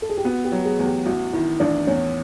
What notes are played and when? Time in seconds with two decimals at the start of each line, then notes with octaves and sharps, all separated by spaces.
0.02 A4
0.09 G#4
0.17 G4
0.24 B3 F#4
0.45 G4
0.52 F#3
0.65 G#4
0.79 E2
0.85 G4
1.06 A1 F#4
1.33 D#3 E4
1.60 A1 D4
1.87 E2 C#4